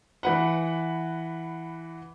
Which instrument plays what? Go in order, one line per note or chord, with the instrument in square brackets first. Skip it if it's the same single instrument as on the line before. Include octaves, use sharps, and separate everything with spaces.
[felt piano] E3 B4 F#5